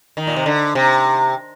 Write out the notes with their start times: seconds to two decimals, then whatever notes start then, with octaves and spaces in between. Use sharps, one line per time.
0.17 D#3
0.27 A#2
0.36 C3
0.46 D3
0.75 C3